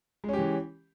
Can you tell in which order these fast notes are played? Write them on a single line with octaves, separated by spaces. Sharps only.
G#3 C#4 G4 E3